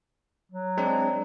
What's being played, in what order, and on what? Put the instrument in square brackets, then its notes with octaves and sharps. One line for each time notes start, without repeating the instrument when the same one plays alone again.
[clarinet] F#3
[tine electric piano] G#3 C4 D4